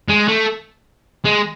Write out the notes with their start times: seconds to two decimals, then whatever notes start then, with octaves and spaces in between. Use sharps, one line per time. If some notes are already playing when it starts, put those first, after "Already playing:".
0.08 G#3
0.28 A3
1.25 G#3